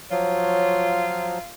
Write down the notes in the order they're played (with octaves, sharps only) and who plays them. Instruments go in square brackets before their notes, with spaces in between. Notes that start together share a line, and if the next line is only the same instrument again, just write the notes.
[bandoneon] F3 F#3 [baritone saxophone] F4 [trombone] C#5